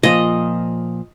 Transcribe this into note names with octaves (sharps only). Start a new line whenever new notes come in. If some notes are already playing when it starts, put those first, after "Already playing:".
A#2 F3 D#5